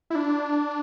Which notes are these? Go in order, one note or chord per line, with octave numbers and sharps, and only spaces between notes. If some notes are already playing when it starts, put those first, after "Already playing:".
E4
D4